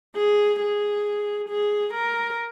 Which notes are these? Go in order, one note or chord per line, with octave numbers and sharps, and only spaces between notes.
G#4
G#4
G#4
A#4